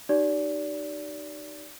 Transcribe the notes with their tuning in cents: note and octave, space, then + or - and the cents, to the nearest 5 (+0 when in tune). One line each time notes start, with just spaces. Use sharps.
D#4 -25 G4 -35 D5 -25